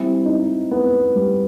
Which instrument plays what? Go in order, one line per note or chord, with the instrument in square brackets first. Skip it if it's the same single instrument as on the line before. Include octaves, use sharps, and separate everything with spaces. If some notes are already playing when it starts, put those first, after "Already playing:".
Already playing: [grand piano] G3 [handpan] C4 E4
[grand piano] D#4
B3
G3